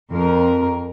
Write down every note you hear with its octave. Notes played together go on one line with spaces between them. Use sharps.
F2 A#4